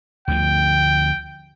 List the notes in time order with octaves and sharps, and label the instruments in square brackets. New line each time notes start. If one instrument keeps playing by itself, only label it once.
[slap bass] D2 D3 F3 [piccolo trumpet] G5